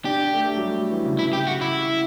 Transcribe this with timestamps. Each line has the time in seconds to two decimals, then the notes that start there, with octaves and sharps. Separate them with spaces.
0.05 D4 G4
0.33 A3
0.47 A3
0.56 F#3
0.61 G3
0.91 E3
1.05 C#3
1.19 C#3 E4
1.33 G4
1.47 F#4
1.61 E4